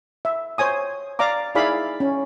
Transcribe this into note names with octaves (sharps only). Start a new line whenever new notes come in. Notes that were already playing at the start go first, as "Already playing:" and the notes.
E5
C5 C#5 G#5 D#6
D5 F5 A#5 D6
D#4 E4 G#4 D5 F5 B5
C#4